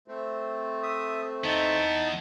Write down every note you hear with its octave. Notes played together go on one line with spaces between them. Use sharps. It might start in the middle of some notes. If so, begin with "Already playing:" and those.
A3 C4
E5 D#6
E3 B3 D#4 A5